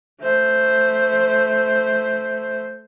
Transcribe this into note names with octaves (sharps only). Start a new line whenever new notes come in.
A3 C5